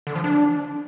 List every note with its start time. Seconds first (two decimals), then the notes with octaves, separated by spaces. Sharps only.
0.07 D3
0.15 F3
0.24 D4